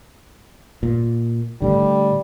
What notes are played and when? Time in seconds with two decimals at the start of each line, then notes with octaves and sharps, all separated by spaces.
0.83 A#2
1.62 A2 D3 G3